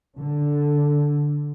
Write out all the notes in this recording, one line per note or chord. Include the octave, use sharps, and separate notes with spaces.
D3